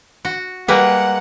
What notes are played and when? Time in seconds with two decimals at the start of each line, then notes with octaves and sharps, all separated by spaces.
0.25 F#4
0.68 G3 G#3 A#3 B4 F#5 G5